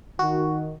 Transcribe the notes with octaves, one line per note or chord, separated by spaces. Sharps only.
D#3 F#4